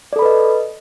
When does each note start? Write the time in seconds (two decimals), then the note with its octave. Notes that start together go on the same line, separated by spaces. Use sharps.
0.13 D5
0.16 A4
0.19 B5
0.22 B4
0.25 D#5